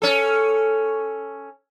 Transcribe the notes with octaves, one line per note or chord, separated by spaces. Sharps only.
C#4 A4